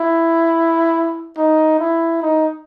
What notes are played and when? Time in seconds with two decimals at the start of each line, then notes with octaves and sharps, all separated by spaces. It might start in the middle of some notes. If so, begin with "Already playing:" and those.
Already playing: E4
1.37 D#4
1.79 E4
2.22 D#4